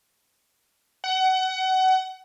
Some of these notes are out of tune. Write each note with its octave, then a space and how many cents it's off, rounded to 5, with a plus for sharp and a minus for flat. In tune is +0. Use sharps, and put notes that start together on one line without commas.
F#5 +25